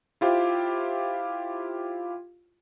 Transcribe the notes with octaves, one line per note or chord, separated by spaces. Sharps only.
E4 F4 G4 C5